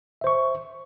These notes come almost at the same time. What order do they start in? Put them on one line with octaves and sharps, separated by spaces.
E5 C5 C#6